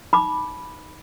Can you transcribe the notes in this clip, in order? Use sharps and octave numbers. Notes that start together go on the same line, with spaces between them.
D#4 B5 D6